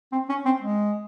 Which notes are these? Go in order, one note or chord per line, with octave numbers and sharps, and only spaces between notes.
C4
C#4
C4
G#3